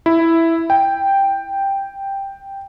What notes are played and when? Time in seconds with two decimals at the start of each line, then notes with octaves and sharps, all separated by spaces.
0.06 E4
0.70 G5